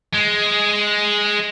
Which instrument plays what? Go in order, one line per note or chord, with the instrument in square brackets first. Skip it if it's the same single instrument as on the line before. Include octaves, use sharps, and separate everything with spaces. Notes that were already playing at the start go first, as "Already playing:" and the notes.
[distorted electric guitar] G#3